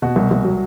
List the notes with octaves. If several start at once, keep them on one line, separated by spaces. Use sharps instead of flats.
B2 F#4
C2
C2
F#3